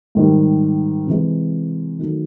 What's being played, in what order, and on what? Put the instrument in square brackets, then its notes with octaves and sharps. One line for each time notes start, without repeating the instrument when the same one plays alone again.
[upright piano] G#2 D#3 G3
C3 E3 G#3
D#3 F#3 A3